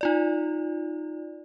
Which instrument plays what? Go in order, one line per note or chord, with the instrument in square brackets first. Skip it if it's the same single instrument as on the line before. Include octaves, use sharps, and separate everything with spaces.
[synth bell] D#4 F4 D5